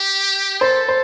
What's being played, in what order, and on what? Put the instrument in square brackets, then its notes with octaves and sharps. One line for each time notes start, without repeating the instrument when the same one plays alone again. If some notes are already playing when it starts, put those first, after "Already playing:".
Already playing: [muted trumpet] G4
[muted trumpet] A4 [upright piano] C5
[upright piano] C5